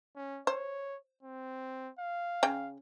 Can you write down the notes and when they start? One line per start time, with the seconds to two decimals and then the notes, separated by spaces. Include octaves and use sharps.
0.16 C#4
0.47 C5 C#5
1.23 C4
1.99 F5
2.43 C#3 G5